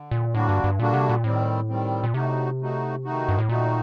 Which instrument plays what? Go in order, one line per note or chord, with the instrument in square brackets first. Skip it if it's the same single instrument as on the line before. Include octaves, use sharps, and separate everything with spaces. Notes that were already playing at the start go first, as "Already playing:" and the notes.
Already playing: [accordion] D3
[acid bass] A#2
[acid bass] A2 [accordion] D3 G3 A#3 D4 F#4
[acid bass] G2
G2
[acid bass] A#2 [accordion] D3 G3 A#3 D4 F#4
[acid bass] C3
A#2
[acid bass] A2 [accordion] D#3 G3 C4
[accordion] D#3 G3 C4
[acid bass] A#2
[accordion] A2 A3 D#4 F#4 [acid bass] C3
[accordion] A2 A3 D#4 F#4
D#3 A3 D#4 F#4
[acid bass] G2
A2
[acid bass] A#2 [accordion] D#3 A3 D#4 F#4